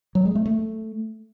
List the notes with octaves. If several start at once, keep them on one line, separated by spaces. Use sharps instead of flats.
F#3
G#3
A3
A3